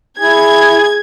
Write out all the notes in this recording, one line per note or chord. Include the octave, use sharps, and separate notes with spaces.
E4 G#4 G#6